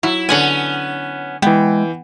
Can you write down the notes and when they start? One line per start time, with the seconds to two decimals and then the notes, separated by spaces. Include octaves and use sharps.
0.03 F#3 E4
0.29 D3 B3 C#4 F#5 G#5
1.42 E3 G#3 B3 G5